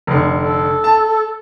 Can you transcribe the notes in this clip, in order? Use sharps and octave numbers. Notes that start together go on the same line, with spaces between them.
F1 D3
A4
A5